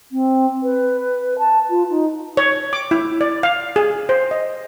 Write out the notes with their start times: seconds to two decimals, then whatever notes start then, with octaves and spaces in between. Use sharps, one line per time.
0.11 C4
0.63 B4
1.39 A5
1.70 F4
1.90 D#4
2.37 C#5
2.73 D6
2.91 E4
3.21 D5
3.43 F5
3.76 G#4
4.09 C5
4.31 D#5